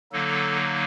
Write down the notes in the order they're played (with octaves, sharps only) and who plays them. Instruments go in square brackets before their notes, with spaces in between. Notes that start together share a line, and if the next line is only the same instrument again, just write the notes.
[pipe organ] D3 F#3 A#3 D#4 A4